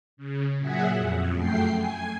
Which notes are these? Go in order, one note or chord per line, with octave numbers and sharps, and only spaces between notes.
C#3
A#2 F#3 G#4 E5 F#5
F2
F#2 A3 G5 C7
G#5